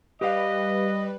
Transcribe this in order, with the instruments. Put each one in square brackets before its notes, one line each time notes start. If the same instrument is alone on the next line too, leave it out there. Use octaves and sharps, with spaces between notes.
[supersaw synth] G3 B4 [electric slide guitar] G4 F5 [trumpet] D#5